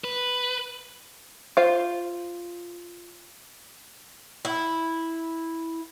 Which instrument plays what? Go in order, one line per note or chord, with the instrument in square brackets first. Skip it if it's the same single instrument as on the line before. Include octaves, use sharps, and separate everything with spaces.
[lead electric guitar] B4
[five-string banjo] F4 C5 F5
[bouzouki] E4